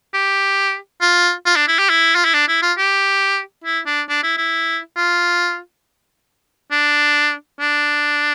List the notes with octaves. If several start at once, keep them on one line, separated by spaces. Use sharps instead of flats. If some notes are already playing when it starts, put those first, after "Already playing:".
G4
F4
F4
D4
E4
G4
E4
F4
E4
D4
E4
F4
G4
E4
D4
D4
E4
E4
F4
D4
D4